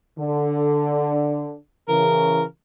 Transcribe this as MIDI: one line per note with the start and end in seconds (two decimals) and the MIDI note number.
0.19 1.55 50
1.88 2.43 49
1.88 2.43 52
1.88 2.43 70